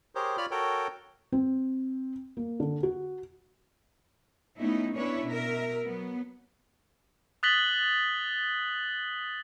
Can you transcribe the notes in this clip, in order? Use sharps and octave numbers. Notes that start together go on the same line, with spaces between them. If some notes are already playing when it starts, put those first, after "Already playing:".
G4 G#4 A#4 C5 C#5
F4 C#5 D5 B5 F6
F#4 A4 A#4 C#5 G5
C4
A#3
D3
F#4
A3 B3 C#4 D#4 E4
B3 C#4 D4 E4 B4 C#5
B2 A#4 E5
F#3 B3
D#6 F#6 A6 B6 F#7 G7